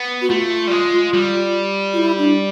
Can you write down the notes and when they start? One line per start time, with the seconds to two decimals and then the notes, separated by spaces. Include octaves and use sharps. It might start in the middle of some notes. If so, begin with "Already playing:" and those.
Already playing: B3
0.22 F#4
0.30 A3 F4
0.67 G3
0.71 G#3
1.14 G3
1.93 F4
1.97 E4
2.18 D4